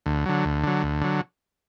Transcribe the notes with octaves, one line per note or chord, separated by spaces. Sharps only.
D2
D3 F#3
D2
D3 F#3
D2
D3 F#3